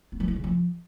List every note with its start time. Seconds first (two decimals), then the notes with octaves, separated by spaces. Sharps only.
0.12 B3
0.20 F#3
0.28 E4
0.36 C#3
0.44 F3